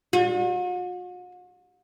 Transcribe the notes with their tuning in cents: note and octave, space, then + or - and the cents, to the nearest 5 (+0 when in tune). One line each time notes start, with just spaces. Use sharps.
F#4 -45